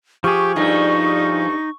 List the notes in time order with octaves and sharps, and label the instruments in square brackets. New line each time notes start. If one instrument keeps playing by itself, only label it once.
[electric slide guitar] F3 G#4 [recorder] G4 [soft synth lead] C#6
[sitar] G2 A3 [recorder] D#4